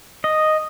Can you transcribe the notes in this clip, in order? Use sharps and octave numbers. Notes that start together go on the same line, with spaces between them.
D#5